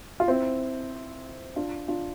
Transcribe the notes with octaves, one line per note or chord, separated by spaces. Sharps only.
F4
C4 E4
D4 F4
D4 F4